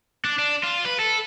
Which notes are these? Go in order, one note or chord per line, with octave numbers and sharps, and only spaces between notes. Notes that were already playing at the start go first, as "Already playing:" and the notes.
D4
D4
F4
B4
A4